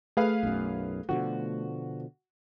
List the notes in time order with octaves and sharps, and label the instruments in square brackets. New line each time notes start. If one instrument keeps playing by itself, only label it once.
[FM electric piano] A3 [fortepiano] G#4 B4 F5
[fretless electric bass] B1 F#2
[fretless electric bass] B2 D3 F3 [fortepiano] F#4